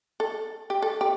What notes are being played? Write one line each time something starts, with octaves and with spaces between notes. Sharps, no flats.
A4
G4
A4
G4